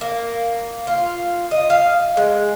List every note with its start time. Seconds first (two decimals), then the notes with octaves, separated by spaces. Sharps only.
0.01 A#3
0.87 F4
1.51 D#5
1.70 F5
2.17 G#3